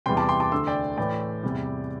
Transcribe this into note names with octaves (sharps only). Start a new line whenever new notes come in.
E2 C3 E3 G3 G5 C6
A5 D6
G5 C6
A5 D6
D2 D3 A3 C6 E6
D5 G5
A2 E3 A3 D5 G5
E2 C3 G3